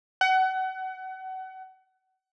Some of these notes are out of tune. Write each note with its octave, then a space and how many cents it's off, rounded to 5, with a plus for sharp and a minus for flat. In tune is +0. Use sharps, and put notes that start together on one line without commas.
F#5 +30